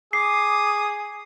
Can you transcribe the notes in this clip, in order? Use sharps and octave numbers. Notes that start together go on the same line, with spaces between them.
G#4 D6 D#6 C7